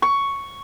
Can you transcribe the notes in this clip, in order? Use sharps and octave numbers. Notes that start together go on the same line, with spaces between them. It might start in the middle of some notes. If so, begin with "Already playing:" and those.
C#6